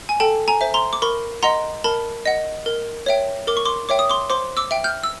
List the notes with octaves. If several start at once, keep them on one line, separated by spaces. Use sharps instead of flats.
G#5
A4 G5 A5
G#5 A#5
C5 E5
A#5 C6
D6
A#4 B5 C#6
D#5 F#5 A#5 C6
A#4 A5 B5
D#5 F#5
A#4
C#5 E5 G5
A#4 D6
C#6
C6 D6
C#5 E5 G5 D6
D#6
C6 D6
C5 C6 D6
D6 E6
E5 G5
F6 G6
E6